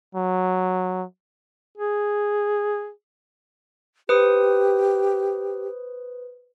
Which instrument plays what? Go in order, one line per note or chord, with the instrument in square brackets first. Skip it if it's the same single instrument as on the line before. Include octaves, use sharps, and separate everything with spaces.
[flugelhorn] F#3
[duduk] G#4
[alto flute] G4 [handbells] B4 C5 D#6